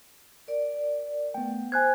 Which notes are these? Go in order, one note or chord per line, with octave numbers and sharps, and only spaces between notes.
A#4 D5
A3 B3 G5
C5 G#5 F#6 G#6